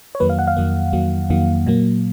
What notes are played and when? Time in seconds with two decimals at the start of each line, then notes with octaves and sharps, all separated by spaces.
0.15 C#5
0.20 F2 D#3 F#3 A#3 B4
0.29 F5
0.39 F#5
0.47 F5
0.57 F2 D#3 F#3 A#3
0.93 F2 D#3 F#3 A#3
1.30 F2 D#3 F#3 A#3
1.66 A#2 F#3 A#3